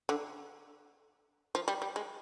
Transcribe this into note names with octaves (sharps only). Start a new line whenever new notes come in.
D3
F3
G3
G3
G#3